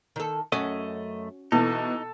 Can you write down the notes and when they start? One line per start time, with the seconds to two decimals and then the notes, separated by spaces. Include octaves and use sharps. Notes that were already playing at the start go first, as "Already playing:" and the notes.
0.16 D#3 A4
0.52 F#2 A3 C#4 F#4 D#5
1.52 B2 E3 D#4 A4